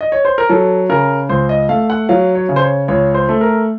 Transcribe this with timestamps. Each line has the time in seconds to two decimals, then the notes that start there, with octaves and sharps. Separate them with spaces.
0.01 D#5
0.12 C#5
0.25 C5
0.38 A#4
0.49 F#3 A4
0.89 C#3 A#4
1.29 C#2 C5
1.49 D#5
1.69 A3 F5
1.90 F#5
2.09 F#3 F5
2.35 C#5
2.49 C#3
2.56 C5
2.62 C#5
2.88 C#2 C#5
3.14 C5
3.29 A3
3.41 A#4